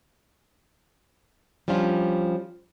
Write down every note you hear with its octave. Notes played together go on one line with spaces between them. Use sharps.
F3 G3 C#4 D4 F4